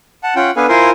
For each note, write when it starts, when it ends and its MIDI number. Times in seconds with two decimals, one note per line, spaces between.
0.23 0.34 78
0.23 0.34 81
0.36 0.51 61
0.36 0.51 65
0.36 0.51 78
0.36 0.51 79
0.56 0.66 59
0.56 0.66 62
0.56 0.66 69
0.56 0.66 71
0.56 0.66 77
0.56 0.66 80
0.69 0.91 64
0.69 0.91 65
0.69 0.91 70
0.69 0.91 72
0.69 0.91 80
0.69 0.91 84